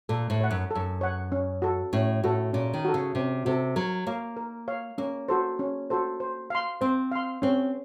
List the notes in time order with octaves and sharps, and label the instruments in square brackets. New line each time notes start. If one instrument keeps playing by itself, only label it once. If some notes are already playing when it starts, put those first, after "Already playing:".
[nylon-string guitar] A#2 [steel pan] A4
[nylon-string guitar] A2
[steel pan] C#5 F#5
[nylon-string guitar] F#2
[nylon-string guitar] F#2 [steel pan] A4
[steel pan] C#5 F#5
C#4
F#4 A4
[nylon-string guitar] A2 [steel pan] C#4
[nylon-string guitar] A2 [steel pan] F#4 A4
[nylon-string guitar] A#2 [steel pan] C#4
[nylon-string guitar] D#3
[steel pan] F#4 A4
[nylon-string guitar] C#3
[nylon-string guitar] C3 [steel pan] C#4
[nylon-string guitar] C3 [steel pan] F#4 A4
[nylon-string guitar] F#3 [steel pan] A#4
[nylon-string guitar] A#3 [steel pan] C#5 F5
[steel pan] A#4
C#5 F5
[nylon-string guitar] A#3 [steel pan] C#4
[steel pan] F#4 A4 C5
C#4
F#4 A4 C5
C5
F5 C6
[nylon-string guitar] C4 [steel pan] C5
[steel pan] F5 C6
[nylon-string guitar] C4 [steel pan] C#4